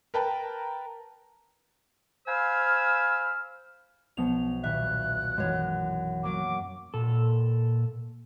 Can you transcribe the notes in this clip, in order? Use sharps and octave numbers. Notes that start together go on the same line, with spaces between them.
A#4 B4 G5 A5 A#5
C5 F5 G#5 B5 E6 F6
B1 F3 B3 F7
D#1 E5 F#6
F#2 E3 G#3 C#5
F#3 A#3 D6
A#2 A4